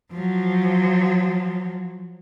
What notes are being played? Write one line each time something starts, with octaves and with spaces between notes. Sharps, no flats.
F3 F#3